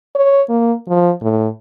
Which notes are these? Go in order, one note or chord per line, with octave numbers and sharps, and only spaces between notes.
C#5
A#3
F3
A2